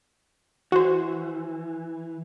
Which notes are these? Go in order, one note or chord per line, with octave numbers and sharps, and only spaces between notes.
E3 F#4 C5